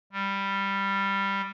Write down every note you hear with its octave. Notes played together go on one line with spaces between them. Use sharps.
G3